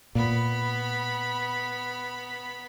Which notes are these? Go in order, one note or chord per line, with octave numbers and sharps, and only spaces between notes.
A#2 B3 B5